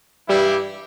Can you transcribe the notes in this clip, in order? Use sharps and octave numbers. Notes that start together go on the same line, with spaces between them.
G2 E3 G3 E4 G4